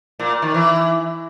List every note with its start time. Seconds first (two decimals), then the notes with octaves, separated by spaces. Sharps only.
0.19 A#2
0.42 D#3
0.54 E3